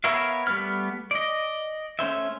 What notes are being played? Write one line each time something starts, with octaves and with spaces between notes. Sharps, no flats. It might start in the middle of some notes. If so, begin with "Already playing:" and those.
B3 A#4 C#5 E5 F5
G3 A3 B3 B4 F6
D5 D#5
A3 C#4 C5 E5